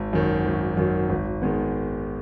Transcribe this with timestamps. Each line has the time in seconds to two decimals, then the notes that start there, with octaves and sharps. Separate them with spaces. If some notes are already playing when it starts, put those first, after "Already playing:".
Already playing: G#1
0.13 F#2 D#3 F#3
0.46 G#1
0.77 F#2 D#3 F#3
1.10 G#1
1.42 D#3 G#3 B3